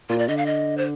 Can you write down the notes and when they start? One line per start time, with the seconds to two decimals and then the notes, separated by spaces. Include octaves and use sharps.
0.09 A#2 F4
0.19 D5
0.28 D3 D#5
0.37 F5
0.46 D#5
0.77 C5